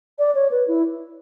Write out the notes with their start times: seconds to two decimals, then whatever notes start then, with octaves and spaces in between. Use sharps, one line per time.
0.19 D5
0.35 C#5
0.51 B4
0.68 E4